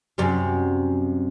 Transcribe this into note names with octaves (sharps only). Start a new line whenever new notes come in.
F#2 C3 G3